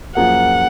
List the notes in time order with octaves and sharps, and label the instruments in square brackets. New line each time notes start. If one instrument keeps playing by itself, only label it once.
[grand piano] F#2 F3 A#3 F4 G#4 [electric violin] F#5